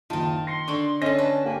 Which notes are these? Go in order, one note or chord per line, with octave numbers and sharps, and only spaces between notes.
F#1 D#3 D#4 F4 A5
C6 A#6 C7 C#7
D3 D4 C#6
D3 C#4 D#5 A5 A#6
B4 A5
A#3 G4 G#5